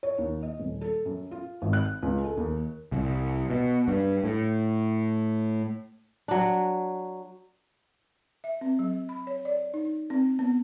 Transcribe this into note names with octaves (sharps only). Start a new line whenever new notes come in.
C#5
D#2
D#5
D#1
A4
F#2
F4
G#1
F#6
C#2
A4
D#2
C2
B2
G2
A2
F#3 D4
E5
C4
F#3
B5
C#5
D5
D#4
C4
B3